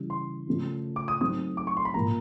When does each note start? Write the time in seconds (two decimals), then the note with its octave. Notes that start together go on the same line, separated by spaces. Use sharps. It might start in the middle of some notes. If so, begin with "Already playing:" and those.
Already playing: C#3 E3 G3
0.10 C6
0.47 C#3 F3 A3 C#4
0.96 D6
1.08 D#6
1.21 F#3 A3 C4 D#4 D#6
1.57 D6
1.67 C#6
1.77 C6
1.85 B5
1.94 A#2 F3 A#3 A#5